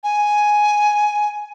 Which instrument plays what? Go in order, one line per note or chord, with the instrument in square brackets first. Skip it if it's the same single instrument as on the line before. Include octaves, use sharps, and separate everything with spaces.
[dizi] G#5